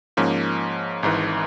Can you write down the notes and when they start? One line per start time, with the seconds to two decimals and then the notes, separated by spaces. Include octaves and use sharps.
0.17 G#2 F3 A#3 C#4
1.03 G#1 G#2 E3